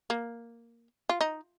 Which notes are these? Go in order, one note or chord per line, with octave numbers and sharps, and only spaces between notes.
A#3
F4
D#4